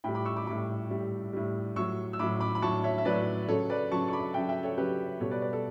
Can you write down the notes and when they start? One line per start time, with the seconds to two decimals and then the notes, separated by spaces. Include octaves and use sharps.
0.04 A2 G5 B5
0.08 G3
0.15 B5 D6
0.25 C#6 E6
0.36 B5 D6
0.47 A2 G3 B5 D6
0.91 A2 G3
1.33 A2 G3
1.76 A2 F#3 C#6 E6
2.13 E6
2.19 A2 F#3 B5 D6
2.40 B5 D6
2.55 B5
2.62 A2 F#3 A5 C#6
2.83 C#5 E5
2.98 E5
3.05 A2 F#3 B4 D5
3.49 C#3 F#3 A4 C#5
3.70 B4 D5
3.91 C#3 F#3 A5 C#6
4.08 C#6
4.13 B5 D6
4.34 C#3 F#3 E5 G5
4.49 E5 G5
4.63 A4 C#5
4.78 C#3 F#3 G4 B4
5.20 B2 G3 A4 C#5
5.31 B4 D5
5.42 B4 D5
5.53 A4